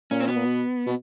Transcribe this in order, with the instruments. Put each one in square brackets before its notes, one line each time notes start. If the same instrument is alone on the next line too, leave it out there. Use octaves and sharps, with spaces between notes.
[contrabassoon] A#2 [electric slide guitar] C#4
[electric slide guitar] C4
[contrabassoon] B2 [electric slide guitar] B3
[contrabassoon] A#2
B2
B2